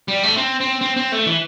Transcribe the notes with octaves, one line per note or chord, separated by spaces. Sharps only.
G3
A3
C4
C4
C4
C4
A3
E3